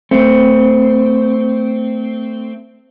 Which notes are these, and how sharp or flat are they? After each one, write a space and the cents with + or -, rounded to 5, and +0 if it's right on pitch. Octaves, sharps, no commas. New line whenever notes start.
A3 +20 C4 -15